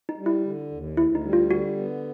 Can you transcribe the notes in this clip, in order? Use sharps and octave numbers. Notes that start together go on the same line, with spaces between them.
D#4
G3
E4
D3
D#2
D2 E4
D#4
G3
F4
D3 F#4
B3